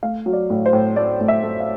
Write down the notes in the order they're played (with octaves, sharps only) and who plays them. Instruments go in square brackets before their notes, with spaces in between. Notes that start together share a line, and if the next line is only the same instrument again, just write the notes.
[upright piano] A3 F5
F#3
D5
A2
C5
A2
A3 D5
A2
E5
A3
F5